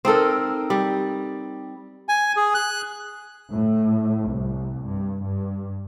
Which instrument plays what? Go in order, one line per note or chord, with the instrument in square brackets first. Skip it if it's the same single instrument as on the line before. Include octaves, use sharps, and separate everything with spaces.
[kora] C4 D#4 A4 A#4
G3
[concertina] G#5
G#4
F#6
[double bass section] A2
C2
G2
G2